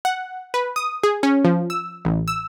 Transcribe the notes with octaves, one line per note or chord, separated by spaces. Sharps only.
F#5
B4
D#6
G#4
C#4
F3
E6
A1
E6